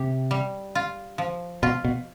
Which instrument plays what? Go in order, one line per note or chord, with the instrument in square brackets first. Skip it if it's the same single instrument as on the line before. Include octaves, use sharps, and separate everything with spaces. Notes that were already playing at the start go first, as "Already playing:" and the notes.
Already playing: [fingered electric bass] C3 [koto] G4
[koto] G3
F4
F3
[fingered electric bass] B2 [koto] F4
[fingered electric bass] B2